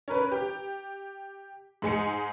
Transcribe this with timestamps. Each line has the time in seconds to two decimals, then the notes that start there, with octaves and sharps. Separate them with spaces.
0.08 C#4 A#4 B4
0.32 G4
1.82 G#2 G#3 G#5 C#7